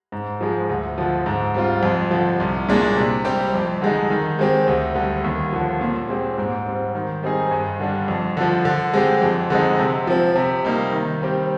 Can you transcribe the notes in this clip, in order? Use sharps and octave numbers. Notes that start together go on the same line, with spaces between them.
G#2
F3 G#3
D2
D3 F3
G#2
G3 C4 F4
F2
D3 F3
C2
A#2 G#3 D4
C3
G3 C4 G4
F2
D3 G#3 D#4
D#3
G#3 C4 G4
D2
D3 G3
D#2
D3 F3
A#2
G#3 C4 G4
G#2
G3 C4
D#3
G3 C4 D#4 G#4
G2
D3 G3 D4
F2
D3 F3
D3
G#3 C4 G4
F2
D3 G#3 C4 D#4
C3
F3 C4
C3
G3 A#3 D#4
D#3
G3 C4 G4